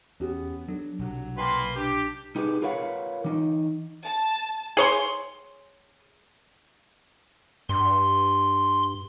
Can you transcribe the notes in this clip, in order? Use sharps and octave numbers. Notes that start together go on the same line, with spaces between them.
E2 B3 C#4 G4 G#4
F#3 D4 A4
B1 C3 F#3 G3
A#3 B4 G5 A5 C6
D4 G4
C2 D#4 G4 G#4 A#4 B4
F4 A#4 B4 C#5 F5 F#5
E3 D#4 D#5
A5
G#4 C#5 C6
G2 C6